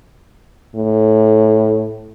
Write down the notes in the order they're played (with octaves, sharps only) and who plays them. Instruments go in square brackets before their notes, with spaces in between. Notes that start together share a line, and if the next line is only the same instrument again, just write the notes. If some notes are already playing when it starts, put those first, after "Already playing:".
[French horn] A2